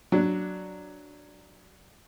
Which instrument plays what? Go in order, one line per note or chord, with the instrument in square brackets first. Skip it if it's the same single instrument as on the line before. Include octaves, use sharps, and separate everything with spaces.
[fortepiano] F#3 D4